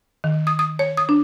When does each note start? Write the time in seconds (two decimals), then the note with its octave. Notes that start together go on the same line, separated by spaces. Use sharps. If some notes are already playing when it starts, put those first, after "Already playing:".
0.24 D#3
0.47 D#6
0.59 D#6
0.79 C#5
0.97 D#6
1.09 D4